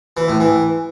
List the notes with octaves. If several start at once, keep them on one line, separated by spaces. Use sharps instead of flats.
E3
A2
E3